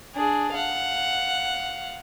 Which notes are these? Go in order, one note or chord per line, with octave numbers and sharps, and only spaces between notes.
D4 G#4
F5 F#5